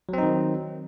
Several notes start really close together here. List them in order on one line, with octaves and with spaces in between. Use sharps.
F#3 C4 D#4 D#3